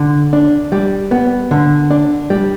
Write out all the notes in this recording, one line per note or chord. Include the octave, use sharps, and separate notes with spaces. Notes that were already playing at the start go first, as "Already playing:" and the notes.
Already playing: D3
D4
G3
B3
D3
D4
G3